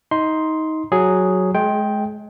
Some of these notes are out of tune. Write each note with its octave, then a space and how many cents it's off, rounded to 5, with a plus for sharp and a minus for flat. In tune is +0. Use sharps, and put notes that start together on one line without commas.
D#4 +20 C6 +0
F#3 +0 G#4 +0
G#3 +30 G5 +0